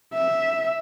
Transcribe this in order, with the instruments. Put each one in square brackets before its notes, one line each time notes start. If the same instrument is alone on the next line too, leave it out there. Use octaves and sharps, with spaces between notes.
[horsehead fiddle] E5